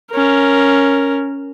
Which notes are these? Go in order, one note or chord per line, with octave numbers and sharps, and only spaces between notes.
C#4 A#4